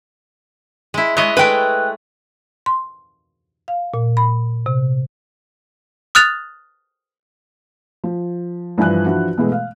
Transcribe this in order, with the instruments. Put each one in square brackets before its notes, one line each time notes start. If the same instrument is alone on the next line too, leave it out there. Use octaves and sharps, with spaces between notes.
[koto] G#3 E4
[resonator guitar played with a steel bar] G#3 [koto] E4 C#5 D#5
[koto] G#3 A3 [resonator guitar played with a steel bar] B4 G5
[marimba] C6
F5
A#2
B5
C3
[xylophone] D#6 F6 F#6 A6 F7
[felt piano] F3
G2 E3 F3 G#5 F#6
E3 F3 D4 F#4
B2 E3 G#3 A3
F5